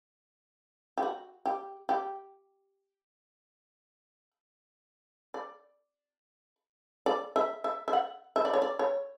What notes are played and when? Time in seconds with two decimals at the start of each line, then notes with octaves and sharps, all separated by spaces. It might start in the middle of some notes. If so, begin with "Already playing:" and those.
0.98 G4
1.03 F#4
1.46 G4
1.89 G4
5.34 D5
7.06 D5
7.36 E5
7.64 E5
7.88 E5
7.93 F#5
8.36 E5
8.45 D5
8.53 C#5
8.62 D5
8.79 C#5